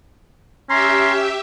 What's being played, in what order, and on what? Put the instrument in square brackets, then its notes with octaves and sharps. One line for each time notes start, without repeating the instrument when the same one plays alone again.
[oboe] C#4 [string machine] G4 E5 [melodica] A#5 C6